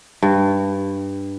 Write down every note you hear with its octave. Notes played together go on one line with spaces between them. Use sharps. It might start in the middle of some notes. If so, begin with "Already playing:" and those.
G2